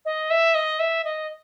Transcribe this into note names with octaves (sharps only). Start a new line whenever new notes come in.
D#5
E5
D#5
E5
D#5